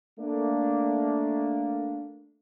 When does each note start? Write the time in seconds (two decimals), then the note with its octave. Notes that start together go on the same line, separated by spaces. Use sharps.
0.20 A3 A#3 D4